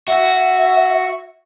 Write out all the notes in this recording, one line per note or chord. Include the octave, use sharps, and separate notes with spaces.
F#4 E5